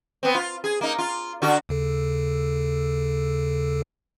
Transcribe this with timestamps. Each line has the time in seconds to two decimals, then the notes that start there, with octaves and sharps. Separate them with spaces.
0.23 B3 C4
0.35 F4
0.64 G#4
0.81 A#3 D#4
0.98 F4
1.42 D3 F#4
1.69 D#2 C#3 A4